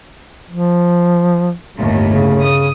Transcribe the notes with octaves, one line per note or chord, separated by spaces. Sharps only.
F3
G1 D#2 A2
C#3
D#6